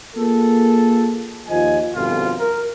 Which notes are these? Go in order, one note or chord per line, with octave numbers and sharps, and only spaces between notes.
A#3 F4 G#4 A4
D#2 F3 F4 D#5 G#5
G1 C2 F2 B2 F4
A#4